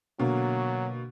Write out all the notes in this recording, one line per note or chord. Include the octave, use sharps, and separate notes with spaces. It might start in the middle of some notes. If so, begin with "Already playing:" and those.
B2 D3 F#3 A#3